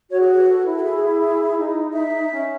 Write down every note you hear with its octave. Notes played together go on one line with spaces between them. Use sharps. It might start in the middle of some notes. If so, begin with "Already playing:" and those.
F#4 C#5
G#4
B4
A4
E4
A4
G#4
D#4
E5
C#4